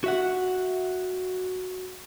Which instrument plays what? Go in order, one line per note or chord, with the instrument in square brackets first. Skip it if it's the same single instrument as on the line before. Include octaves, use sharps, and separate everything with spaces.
[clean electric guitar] F#4 E5 F#5